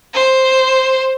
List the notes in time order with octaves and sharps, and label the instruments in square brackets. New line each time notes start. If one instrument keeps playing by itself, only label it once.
[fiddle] C5